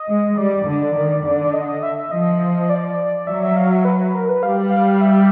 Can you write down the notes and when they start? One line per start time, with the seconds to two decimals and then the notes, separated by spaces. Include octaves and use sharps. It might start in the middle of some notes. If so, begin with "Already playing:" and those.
Already playing: D#5
0.08 G#3
0.37 G3 D5
0.67 D3
0.95 D#3
1.24 D3
1.54 D#5
1.68 D#5
1.83 E5
1.97 E5
2.11 F3 D#5
2.70 D5
3.27 F#3 E5
3.43 E5
3.56 F5
3.71 E5
3.85 B4
3.99 B4
4.15 A#4
4.29 B4
4.43 G3 F5
4.70 F5
5.01 E5